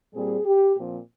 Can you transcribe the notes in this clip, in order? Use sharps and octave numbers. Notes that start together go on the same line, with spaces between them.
A#2 G3 C4 G#4
G4
A#2 F3 C4